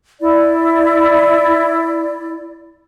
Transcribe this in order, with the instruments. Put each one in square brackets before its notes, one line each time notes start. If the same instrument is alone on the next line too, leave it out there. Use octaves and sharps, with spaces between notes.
[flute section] E4 D5